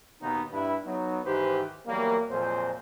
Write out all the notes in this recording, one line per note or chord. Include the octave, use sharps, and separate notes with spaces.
D#2 B2 D#3 B3 D#4
G2 E4 B4
F#3 B3 D#4
G#2 D#3 E3 G4 B4 C5
E2 F#3 G3 A#3
F2 A#2 F#3 G#3 C5